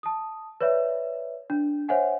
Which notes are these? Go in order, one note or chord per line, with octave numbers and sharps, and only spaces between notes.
A5 D#6
B4 C#5 D5 E5
D4
C5 C#5 E5 F#5 G#5